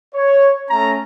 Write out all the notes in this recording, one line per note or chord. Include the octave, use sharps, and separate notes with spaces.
C#5
A3 C#4 A#5